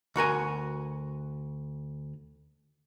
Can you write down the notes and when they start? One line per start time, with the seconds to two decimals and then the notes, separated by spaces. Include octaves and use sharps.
0.16 D2 F#4 A#4 G#5